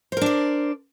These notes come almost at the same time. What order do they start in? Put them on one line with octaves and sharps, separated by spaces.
C5 A#4 D4 D5